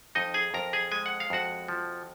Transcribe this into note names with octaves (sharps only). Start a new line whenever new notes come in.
F2 D#4 D#5
G#4 G#5
F2 A#4 A#5
G#4 G#5
G#3 G#5
F#5
F5
F2 F#4 F#5
F3